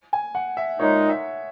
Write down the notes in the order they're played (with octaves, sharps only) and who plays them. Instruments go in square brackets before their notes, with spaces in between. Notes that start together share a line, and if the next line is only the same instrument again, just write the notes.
[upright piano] G#5
F#5
E5
[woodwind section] A#2 G#3 D#4 [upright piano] C#5
[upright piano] E5